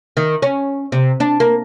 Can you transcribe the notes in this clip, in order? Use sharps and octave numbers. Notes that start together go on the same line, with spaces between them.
D#3
C#4
C3
D4
A#3